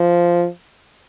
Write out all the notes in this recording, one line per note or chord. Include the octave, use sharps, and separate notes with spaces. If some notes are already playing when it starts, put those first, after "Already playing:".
Already playing: F3